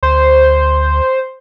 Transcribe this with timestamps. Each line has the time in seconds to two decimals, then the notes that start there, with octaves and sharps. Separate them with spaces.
0.03 D2 C5